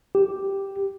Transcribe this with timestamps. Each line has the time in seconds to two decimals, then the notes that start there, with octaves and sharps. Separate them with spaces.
0.15 G4